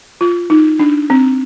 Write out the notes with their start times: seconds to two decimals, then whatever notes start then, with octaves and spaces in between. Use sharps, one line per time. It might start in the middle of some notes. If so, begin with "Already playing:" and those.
0.21 F4
0.50 D#4
0.79 D4
1.10 C4